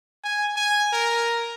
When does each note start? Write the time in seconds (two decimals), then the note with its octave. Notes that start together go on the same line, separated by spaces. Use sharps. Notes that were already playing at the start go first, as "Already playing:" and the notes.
0.24 G#5
0.56 G#5
0.93 A#4